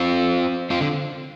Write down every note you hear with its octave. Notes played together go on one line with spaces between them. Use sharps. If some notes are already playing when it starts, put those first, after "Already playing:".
Already playing: C4 F4
C4 F4
D3